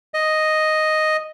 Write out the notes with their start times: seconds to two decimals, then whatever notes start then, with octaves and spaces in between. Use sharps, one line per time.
0.14 D#5